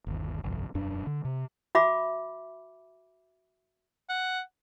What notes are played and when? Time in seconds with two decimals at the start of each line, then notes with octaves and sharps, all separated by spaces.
0.07 G1 D#2
0.44 G1 C2 F2
0.74 E1 F#2 D4
1.07 D3
1.25 C3
1.75 F#4 E5 B5 D6
4.09 F#5